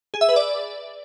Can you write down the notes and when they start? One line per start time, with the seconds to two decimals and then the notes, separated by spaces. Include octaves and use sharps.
0.14 G#4
0.21 E5
0.29 B4
0.36 D5